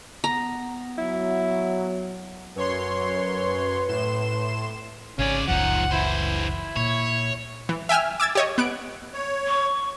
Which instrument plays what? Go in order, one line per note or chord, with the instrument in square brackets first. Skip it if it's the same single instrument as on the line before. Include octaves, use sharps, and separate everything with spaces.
[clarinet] B3 [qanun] A#5
[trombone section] F#3 [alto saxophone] E4
[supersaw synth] F#2 C#5 C6 [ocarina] B4
[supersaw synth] A2 C6 E7
[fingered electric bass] G#1 [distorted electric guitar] C#3 D5 [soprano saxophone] C#4
[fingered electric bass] F#1 C#2 [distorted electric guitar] F3 D#4 [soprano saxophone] F#5
[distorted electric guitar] E3 C5 [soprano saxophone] E4
[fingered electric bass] A#2 [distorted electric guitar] C#5
[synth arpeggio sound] E3
E5 G5 G#5 E6 F6
D6 E6 G#6 A6
G4 C#5 D#5
B3 F#6 D7
[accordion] C#5
[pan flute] C#6